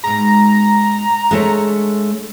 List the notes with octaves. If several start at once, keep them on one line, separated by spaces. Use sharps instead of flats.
G#2 B2 G#3 A#5
G#3 A3 D4 C#5